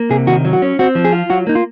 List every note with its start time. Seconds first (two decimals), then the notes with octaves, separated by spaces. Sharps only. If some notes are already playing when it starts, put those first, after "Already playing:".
Already playing: A#3
0.10 C3 G#4
0.27 D#3 F#4
0.45 F#3
0.53 F#4
0.62 C#4
0.79 C4 F#4
0.95 F3
1.05 G#4
1.12 F4
1.30 F#3 F#4
1.47 A#3 D#4
1.55 F4